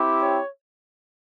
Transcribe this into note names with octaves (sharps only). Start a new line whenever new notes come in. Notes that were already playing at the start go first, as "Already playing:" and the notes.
Already playing: C4 E4 G4
C#5